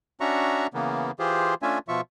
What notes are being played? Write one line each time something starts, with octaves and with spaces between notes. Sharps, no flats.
C#4 D4 F#4 E5 A#5 C#6
C#3 E3 A#3 B3
E3 F4 G4 G#4 C5
A3 C#4 D4 F4 E5 G#5
B2 F3 F4 E5 C#6